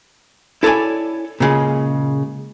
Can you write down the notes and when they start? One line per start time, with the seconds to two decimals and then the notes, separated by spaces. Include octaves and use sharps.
0.63 E4 A4 C#5 D5 G#5
1.40 A#2 C#3 G#3